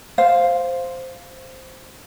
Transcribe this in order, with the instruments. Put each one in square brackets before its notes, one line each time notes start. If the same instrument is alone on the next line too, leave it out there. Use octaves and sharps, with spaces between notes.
[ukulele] C5 F5